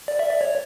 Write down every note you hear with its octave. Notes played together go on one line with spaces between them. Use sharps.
D5
E5
D5
C#5